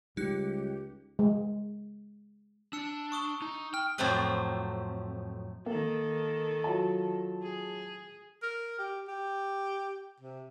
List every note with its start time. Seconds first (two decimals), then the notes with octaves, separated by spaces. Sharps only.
0.17 C#2 G3 D#4 G4 F#6 C#7
1.19 G#3
2.73 D4 E6 C#7
3.12 C#6 D#6 G7
3.42 D#4
3.74 G5 F6
3.98 F2 A2 F#3 A3 C4 B4
5.66 D#3 A#3 A4
6.64 F#3 F4 A5
7.42 G#4
8.42 A#4
8.79 G4
9.08 G4
10.20 C3